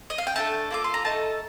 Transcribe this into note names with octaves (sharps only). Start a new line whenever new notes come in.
D#5
F5
G5
A3 D4 A4 A5
A#3 F4 A4 D6
C6
A#5
A3 D#4 A4 A5